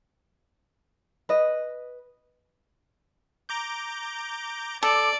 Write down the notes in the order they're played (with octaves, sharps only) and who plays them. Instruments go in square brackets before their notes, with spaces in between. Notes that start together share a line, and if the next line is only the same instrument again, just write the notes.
[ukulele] B4 D#5
[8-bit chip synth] A#5 D6 G6
[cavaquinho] A4 [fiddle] D5 [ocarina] D6